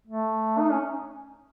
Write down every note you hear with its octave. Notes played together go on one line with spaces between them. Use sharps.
A3
D#4
C#4